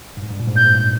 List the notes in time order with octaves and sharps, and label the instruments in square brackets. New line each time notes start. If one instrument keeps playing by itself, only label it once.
[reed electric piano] G2
G#2
G2
A#2
G#2
[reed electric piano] A#2 [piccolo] G6
[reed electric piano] G#2
G2